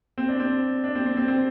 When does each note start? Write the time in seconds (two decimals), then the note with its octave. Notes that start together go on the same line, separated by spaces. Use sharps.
0.18 C4
0.28 D4
0.40 C4
0.84 D4
0.95 C4
1.06 C4
1.17 C4
1.28 C4